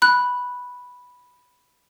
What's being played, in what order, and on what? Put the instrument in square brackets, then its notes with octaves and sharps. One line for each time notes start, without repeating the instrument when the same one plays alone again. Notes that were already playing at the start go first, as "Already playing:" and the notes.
[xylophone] B5 F#6